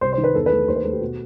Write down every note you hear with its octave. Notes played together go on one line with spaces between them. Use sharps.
C2 C5
C5
D#3
B4
E2 A4
B4
A3
D#2 C5
B4
A3 A4
G4
B2 F#4